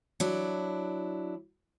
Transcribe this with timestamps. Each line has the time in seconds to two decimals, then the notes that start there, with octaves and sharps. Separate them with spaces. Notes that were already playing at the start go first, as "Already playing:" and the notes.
0.20 F#3 D4 E4